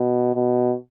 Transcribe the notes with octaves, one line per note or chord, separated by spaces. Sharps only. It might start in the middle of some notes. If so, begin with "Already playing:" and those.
Already playing: B2
B2